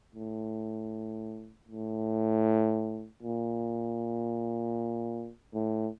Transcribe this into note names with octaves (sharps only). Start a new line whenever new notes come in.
A2
A2
A#2
A2